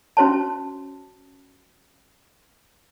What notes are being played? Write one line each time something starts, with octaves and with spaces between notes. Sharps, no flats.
C#4 F#4 C5 C#5 A5